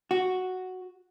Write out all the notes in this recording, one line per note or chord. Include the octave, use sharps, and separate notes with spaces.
F#4